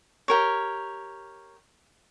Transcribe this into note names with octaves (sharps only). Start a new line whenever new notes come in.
G4 A#4 C#5